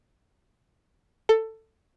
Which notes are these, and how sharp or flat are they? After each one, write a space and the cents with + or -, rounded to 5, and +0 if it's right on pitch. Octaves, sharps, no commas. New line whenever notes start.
A4 +15